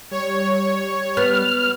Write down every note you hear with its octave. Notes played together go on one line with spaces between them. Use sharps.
G3 C#5
B3 F6